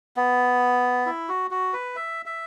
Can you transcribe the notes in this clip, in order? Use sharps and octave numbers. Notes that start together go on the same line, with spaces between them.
B3
E4
F#4
F#4
B4
E5
E5